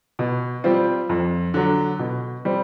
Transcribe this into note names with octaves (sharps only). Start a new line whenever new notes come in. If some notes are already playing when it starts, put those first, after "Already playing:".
B2
G3 C4 F4
F2
D3 F#3
B2
G3 C4